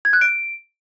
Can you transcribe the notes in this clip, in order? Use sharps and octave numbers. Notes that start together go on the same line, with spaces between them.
G#6
F#6
D7